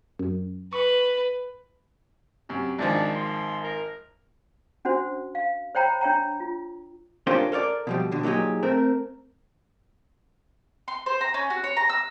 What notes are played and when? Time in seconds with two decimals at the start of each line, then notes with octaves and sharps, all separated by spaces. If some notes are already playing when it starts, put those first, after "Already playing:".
0.19 F#2
0.73 B4 C#6
2.49 F#2 C3
2.78 G#1 D#3 F3 D4
3.15 C6
3.63 A#4
4.85 C#4 D4 F#4 C5
5.35 F5
5.75 C5 C#5 G5 A#5 B5
6.01 D4 C#5 G5 A#5
6.40 F4
7.27 C#4 D4 F4 G4 A#4 C5
7.52 A4 A#4 C#5 D5
7.87 B2 F3 G3
8.11 B2 D3
8.23 A#2 F#3 D#4 G4 G#4
8.63 A3 C4 A#4
10.88 C6
11.06 C5
11.21 A#5
11.34 C#4
11.50 F#4
11.64 C#5
11.77 A#5
11.89 E6